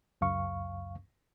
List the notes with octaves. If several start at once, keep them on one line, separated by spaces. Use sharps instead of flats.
C#2 F#2 F5 C#6